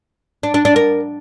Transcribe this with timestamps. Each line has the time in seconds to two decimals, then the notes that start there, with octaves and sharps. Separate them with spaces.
0.43 D4
0.54 D4
0.65 D4
0.76 A#4